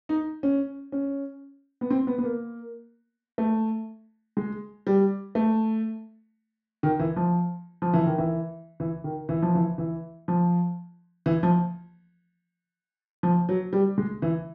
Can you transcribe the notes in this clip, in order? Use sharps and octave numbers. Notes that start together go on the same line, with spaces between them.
D#4
C#4
C#4
B3
C4
B3
B3
A#3
A3
G#3
G3
A3
D#3
E3
F3
F3
E3
D#3
E3
E3
D#3
E3
F3
E3
E3
F3
E3
F3
F3
F#3
G3
G#3
E3